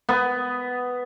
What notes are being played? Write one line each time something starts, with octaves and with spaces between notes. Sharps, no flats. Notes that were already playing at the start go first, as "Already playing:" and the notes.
B3